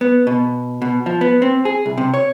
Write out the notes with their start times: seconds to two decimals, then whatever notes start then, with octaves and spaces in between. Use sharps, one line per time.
0.01 B3
0.27 B2
0.82 B2
1.06 F3
1.21 B3
1.42 C4
1.65 G#4
1.86 C2
1.98 C3
2.14 C#5